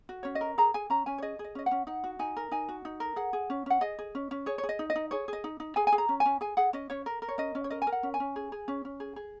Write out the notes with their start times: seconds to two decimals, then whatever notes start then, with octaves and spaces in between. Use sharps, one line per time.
0.09 F#4
0.23 C#4 C#5
0.35 D#5
0.41 A#4
0.58 G#4 A#5
0.74 G#4 G#5
0.90 C#4 A#5
1.06 C#4 G#5
1.18 C#5
1.22 G#4 D#5
1.39 G#4
1.44 D#5
1.55 C#4 D#5
1.66 F#5
1.71 C#4
1.87 D#4 F#5
2.04 F#4
2.19 D#4 G#5
2.37 A#4
2.51 D#4 G#5
2.69 F#4
2.85 D#4
3.00 A#4
3.16 G#4 F#5
3.33 G#4
3.50 C#4
3.66 C#4 F#5
3.81 G#4 D#5
3.99 G#4
4.15 C#4
4.31 C#4
4.46 G#4 C#5
4.58 C#5
4.63 G#4
4.69 D#5
4.79 D#4
4.90 D#5
4.96 D#4
5.11 G#4 C#5
5.28 G#4 D#5
5.44 D#4
5.60 D#4
5.76 G#4 G#5
5.87 G#5
5.92 G#4
5.98 A#5
6.09 C#4
6.20 G#5
6.25 C#4
6.41 G#4 G#5
6.57 G#4 F#5
6.73 C#4 D#5
6.90 C#4 C#5
7.06 A#4
7.22 A#4
7.29 C#5
7.38 C#4 D#5
7.55 C#4
7.64 C#5
7.70 A#4 D#5
7.82 G#5
7.87 A#4
7.92 F#5
8.03 C#4
8.14 G#5
8.20 C#4
8.36 G#4
8.52 G#4
8.68 C#4
8.85 C#4
9.00 G#4
9.16 G#4